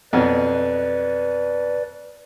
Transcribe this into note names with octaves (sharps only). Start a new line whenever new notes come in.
F2 B2 F#3 B4 D5